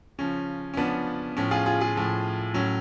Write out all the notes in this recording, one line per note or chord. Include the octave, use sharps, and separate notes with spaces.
C#3 F3 C#4
C#4
C#3 F3 B3 D4
A2 F3 C#4
F4 G#4
F4 G#4
F4 G#4
A2 F3
A2 F#3 C#4